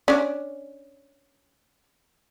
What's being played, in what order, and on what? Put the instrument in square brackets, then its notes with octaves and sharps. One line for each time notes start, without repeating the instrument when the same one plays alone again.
[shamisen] C#4 D4